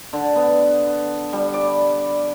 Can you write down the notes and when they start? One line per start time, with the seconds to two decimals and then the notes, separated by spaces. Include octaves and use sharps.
0.13 D3
0.36 B3
1.33 G3
1.54 D5